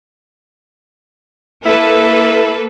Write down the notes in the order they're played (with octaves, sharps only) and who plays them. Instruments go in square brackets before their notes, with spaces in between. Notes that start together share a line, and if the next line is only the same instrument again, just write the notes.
[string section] A#3 A4 B4 [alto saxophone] E4